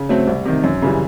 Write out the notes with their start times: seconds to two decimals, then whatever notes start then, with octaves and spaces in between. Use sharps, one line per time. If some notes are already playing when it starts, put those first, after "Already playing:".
Already playing: C#3
0.09 F#3 A3 C4
0.27 C2
0.45 C3 D#3
0.64 F#2
0.82 C#3 E3 G3